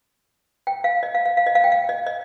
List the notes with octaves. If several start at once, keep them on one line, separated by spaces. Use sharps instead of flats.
G5
F5
D#5
F5
F5
F5
D#5
F5
G5
F5
D#5
D#5